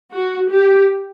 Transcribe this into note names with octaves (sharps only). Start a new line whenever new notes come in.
F#4
G4